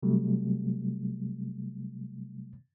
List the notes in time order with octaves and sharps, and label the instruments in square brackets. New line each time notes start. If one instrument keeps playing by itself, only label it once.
[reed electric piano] C3 F#3 G3 A3